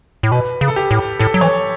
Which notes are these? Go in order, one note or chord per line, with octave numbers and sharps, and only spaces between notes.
A2
B2 B4
C#3
A4
G4
A2
A2 A4
F#3
E3 C#5